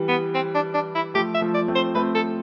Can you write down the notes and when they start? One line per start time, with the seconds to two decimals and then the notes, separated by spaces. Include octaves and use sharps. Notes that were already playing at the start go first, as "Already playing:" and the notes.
Already playing: E3 G3
0.08 B3
0.34 C4
0.54 D4
0.74 D4
0.95 E4
1.14 F3 A3 G4
1.35 E5
1.41 F3 A3
1.54 D5
1.68 A3 C4
1.75 C5
1.95 A3 C4 B4
2.15 A4